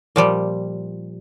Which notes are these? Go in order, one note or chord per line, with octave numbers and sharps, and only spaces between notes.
A#2 F3 G3